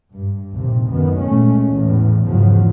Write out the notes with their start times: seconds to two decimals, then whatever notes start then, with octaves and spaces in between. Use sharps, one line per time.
0.12 G2
0.55 A#1 D#2 C3
0.87 F#2 D#3 B3
1.20 A#2 G#3 A3 C#4
1.67 E2 A2
2.24 E2 G#2 C#3 F3 F#3